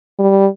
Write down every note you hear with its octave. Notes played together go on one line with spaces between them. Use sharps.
G3